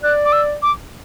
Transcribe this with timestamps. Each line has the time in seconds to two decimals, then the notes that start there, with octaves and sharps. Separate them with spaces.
0.03 D5 F#6
0.25 D6
0.32 E6
0.62 D6